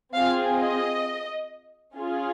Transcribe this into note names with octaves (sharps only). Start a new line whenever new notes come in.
C4 F4 G#4 F5
D#5
C#4 F4 G#4